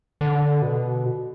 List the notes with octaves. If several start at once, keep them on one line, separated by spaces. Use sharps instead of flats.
D3
B2